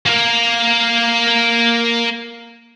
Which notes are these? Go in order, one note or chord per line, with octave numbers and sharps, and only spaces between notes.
A#3 A#4